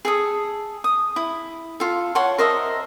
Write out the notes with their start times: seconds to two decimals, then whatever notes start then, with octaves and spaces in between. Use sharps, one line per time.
0.05 G#4 A4 D#6
0.84 D#6
1.16 E4
1.80 F4 A4
2.15 C#5 F#5 A5 C6
2.38 A#4 C5 D#5 E5